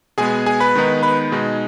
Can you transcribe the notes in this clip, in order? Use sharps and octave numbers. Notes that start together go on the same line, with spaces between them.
B2 G#3 B3 G#4 G#5
G#4 G#5
B4 B5
D#3 G#3 B3 D#4
B4 B5
B2 G#3 D#4